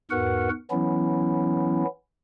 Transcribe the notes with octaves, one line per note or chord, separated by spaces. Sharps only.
E2 G#2 F#4 A#4 B4 F#5
E3 F#3 B3 C#4 E4